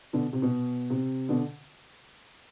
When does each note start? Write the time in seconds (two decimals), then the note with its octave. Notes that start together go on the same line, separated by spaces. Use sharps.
0.13 B2 D3
0.33 C3
0.42 B2
0.90 C3
1.29 B2 D3